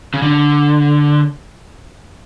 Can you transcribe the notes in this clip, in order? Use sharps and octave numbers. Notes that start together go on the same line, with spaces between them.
C#3
D3